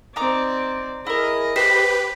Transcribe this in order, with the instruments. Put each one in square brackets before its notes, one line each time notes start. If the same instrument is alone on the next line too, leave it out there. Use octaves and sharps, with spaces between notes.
[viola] C4 D5 [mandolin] D#4 A#5 D6
[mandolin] E4 A#4 [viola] G#4 D#5
[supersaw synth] G4 B4 [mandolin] C5 [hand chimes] B6